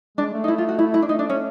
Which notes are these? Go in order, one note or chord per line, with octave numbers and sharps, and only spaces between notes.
G#3 D4
A3
D#4
E4
F4
F#4
E4
E4
D4
A3 D#4
D4
C#4